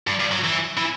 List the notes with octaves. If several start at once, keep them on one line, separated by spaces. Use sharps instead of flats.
G2
G2
F#3
E3
E3